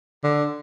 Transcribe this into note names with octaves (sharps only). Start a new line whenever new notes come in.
D3